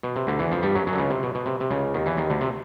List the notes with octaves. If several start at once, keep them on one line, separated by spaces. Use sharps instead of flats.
B2
C3
D2 D3
E2 E3
F2 F3
G2 G3
F#2 F#3
F#2 F#3
D3
C#2 C#3
C3
B2
B2
C3
C3
C#2 C#3
D#2 D#3
E2 E3
D#2 D#3
D2 D3
C3